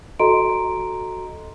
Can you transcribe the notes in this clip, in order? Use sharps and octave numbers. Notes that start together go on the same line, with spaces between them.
F#4 A4 D#5 A#5 C6 D7